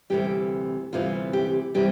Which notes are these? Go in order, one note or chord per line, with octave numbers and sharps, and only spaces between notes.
D2 C3 E3 G3 G4
D2 C3 E3 G3 F4
G4
C3 E3 G3 G4